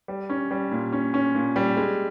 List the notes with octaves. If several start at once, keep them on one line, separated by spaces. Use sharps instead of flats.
G3
C#4
G3
A#2
C#4
C#4
A#2
G3
G#3